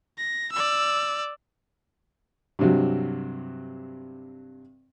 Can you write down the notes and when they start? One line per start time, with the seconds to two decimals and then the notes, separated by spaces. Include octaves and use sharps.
0.18 A#6
0.52 D5 E6
2.59 G2 C3 F#3